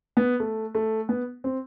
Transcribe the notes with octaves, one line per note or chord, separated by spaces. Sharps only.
B3
A3
A3
B3
C4